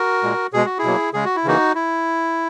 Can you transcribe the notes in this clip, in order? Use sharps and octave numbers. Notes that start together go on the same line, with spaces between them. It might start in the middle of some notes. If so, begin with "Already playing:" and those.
Already playing: F#4 A#4
A#2 G#3
B2 G#3 G#4
F#4
E4 G#4
B2 F#3 A#3
C#3 G#3 G#4
F#4
E4
C#3 E3 A#3 D#4 F#4
E4